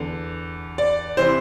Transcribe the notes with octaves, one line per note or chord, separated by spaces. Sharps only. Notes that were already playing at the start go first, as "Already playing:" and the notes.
Already playing: E2 D3
D5
C3 E3 C5